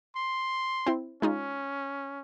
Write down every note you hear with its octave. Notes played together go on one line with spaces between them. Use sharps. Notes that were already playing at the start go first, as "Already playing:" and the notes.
C6
C4 E4
G#3 C#4 D#4 F4